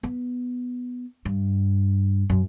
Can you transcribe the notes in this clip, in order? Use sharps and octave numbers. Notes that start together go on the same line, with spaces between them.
B3
G2
F#2